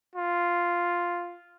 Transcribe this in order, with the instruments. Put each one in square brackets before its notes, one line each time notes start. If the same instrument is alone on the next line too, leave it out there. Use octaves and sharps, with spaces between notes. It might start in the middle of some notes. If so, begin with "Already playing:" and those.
[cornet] F4